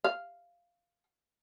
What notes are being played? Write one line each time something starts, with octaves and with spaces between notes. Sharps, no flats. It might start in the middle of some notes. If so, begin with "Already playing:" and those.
F5